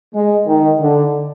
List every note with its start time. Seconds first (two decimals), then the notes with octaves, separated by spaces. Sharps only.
0.14 G#3
0.47 D#3
0.80 D3